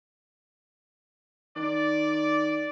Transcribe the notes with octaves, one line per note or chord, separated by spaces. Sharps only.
D#3 D5